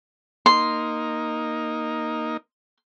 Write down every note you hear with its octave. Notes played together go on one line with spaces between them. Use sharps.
A#3 D#4 C6